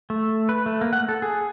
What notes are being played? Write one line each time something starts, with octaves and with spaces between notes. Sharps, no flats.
A3
B4
A3
A#3
F#5
A4
G#4